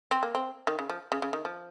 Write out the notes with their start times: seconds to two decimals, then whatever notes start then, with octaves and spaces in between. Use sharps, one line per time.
0.11 C4
0.23 A#3
0.35 C4
0.67 D#3
0.79 C#3
0.89 F3
1.12 C#3
1.22 C#3
1.33 D#3
1.45 F3